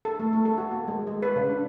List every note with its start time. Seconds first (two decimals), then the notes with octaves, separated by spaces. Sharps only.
0.05 A4
0.20 A3
0.33 A3
0.45 A4
0.58 F#4
0.72 A#3
0.88 G#3
1.07 G#3
1.22 B4
1.36 C#3
1.50 D4